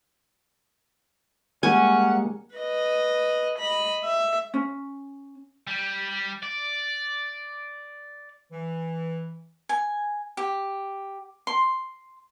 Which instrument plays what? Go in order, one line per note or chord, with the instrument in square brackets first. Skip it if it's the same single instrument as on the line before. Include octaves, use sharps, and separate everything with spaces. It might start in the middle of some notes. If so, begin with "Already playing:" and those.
[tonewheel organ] G3 G#3 A#3 [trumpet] C#4 [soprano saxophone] F#5 [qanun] G#5
[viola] B4 D#5
D#5 B5
E5
[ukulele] C#4
[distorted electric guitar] G3
D5
[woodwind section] E3
[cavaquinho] G#5
G4
C6